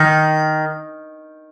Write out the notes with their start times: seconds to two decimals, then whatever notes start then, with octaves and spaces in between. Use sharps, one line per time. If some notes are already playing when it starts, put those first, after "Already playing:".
Already playing: D#3